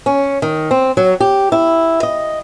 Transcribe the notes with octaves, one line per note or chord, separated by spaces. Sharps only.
C#4
D#3
C4
F#3
G4
E4
D#5